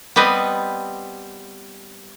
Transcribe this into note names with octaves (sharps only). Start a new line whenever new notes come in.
G3 B3 C4 B4 D#5